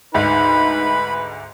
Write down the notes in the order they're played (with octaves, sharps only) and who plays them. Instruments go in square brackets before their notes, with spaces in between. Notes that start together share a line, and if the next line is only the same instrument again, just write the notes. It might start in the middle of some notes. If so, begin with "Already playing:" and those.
[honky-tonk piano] D2 G#2 [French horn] D#4 [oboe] B4 [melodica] B5